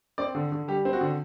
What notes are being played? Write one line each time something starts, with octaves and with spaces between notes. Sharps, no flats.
C4 D5
D3
D3
G3 G4
C4
F#4
D3